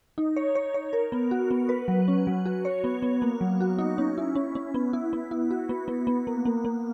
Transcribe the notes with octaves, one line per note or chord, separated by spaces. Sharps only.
D#4
C#5
C#5
C#5
A#4
B3
F#4
B3
B4
F#3
C#4
F#3
F#4
C#5
B3
B3
A#3
F#3
F#4
D#4
C#4
E4
C#4
C#4
B3
E4
B3
E4
F#4
B3
B3
B3
A#3
A#3
A#3